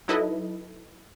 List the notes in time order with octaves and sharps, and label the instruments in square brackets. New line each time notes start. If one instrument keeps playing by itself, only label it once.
[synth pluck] F#3 D#4 E4 A4 B4 D#5